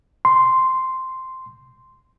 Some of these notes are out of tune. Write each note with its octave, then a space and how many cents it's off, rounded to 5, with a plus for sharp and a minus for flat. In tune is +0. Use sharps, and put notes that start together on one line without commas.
C6 -5